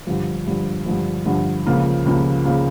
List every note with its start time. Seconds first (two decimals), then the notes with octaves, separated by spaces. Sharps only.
0.07 G2 D3 F3
0.47 G2 D3 F3
0.86 G2 D3 F3
1.26 G2 D3 F3
1.66 C#2 C#3 F3 A#3
2.06 C#2 C#3 F3 A#3
2.45 C#3 F3 A#3